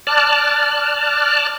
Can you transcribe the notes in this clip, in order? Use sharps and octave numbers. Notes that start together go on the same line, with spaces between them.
D5 A5 F6 F#6